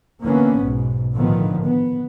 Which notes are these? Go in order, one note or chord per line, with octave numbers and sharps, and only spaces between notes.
D3 E3 A#3 B3 C#4
B1 G#2 B2
A2 D3 D#3 F3 B3
B3